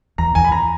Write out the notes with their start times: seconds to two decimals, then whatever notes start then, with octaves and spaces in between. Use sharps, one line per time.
0.18 E2 A#5
0.35 E2 G#5
0.45 B5
0.52 A#5